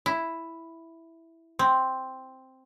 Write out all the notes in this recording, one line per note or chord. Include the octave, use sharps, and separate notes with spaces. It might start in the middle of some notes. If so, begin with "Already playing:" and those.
E4
C4